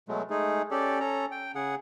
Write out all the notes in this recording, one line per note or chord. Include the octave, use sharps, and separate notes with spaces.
B2 F#3 G#3 A3
G#3 A3 D#4 G#4
C#4 G4 A4 D5
C#4 A4 A#5
G5
C#3 G#4 F#5